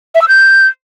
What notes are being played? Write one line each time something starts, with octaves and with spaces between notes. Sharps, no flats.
E5
E6
G6